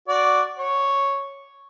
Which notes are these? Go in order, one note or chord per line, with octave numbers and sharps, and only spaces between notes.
F#4 D5
C#5